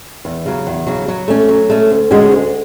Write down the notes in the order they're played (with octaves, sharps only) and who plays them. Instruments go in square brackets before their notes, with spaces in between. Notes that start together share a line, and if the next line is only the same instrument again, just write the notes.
[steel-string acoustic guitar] E2
C#3 F#3
E2
C#3 F#3
F#3
A3 C#4
F#3
A3 C#4
D2
D3 G#3 C#4 F#4
D2